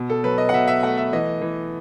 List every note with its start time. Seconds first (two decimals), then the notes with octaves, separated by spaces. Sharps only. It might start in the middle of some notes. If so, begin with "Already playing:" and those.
Already playing: B2
0.10 A4
0.24 F#3 B4
0.38 D#5
0.49 F#5
0.53 B2 E5
0.68 E5
0.83 A3 F#5
0.97 E5
1.13 E3 D#5
1.42 E3